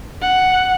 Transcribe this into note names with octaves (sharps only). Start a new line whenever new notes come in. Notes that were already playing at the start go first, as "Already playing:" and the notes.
F#5